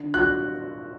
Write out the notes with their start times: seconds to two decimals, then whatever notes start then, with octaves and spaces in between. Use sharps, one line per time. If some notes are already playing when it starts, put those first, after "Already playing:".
Already playing: D3
0.14 F#4 F#6